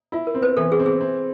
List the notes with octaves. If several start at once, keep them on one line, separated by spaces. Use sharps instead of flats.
E4 F4
A#4
C4
B4
E3 A4
G#4
C4
G#4
C4